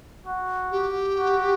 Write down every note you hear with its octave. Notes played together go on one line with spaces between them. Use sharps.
F#4
G4
F#4